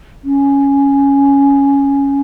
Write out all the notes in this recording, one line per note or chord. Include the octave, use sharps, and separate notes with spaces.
C#4